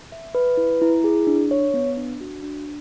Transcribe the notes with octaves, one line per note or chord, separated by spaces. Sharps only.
E5
B4
E4
E4
G#4
D4
C#5
B3
D4
F#4
D4